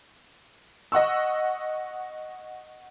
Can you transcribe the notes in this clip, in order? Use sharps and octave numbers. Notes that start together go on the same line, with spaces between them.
D#5 F#5 C#6 E6